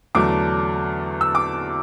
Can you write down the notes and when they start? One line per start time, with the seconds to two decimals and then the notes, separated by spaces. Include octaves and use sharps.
0.15 E2 D3 F#3 A3 D6
1.21 E6
1.35 D6